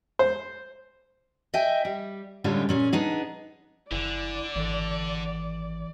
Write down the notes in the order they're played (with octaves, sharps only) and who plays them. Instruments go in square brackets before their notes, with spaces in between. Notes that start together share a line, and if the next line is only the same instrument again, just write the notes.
[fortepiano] C5
[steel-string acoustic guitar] D#5 E5 G5 G#5
G3
A2 D3 G3 G#3 C#4 F4
A#2 C#4 G#4
B3 D4 D#4 G#4
[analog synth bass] F#1 [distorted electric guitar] D3 [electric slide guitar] E4 G#5 [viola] D5
[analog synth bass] G#1 [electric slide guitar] E3 A4